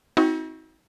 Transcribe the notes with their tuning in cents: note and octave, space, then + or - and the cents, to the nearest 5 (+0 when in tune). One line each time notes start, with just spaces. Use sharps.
C4 +0 D#4 +45 F#4 -10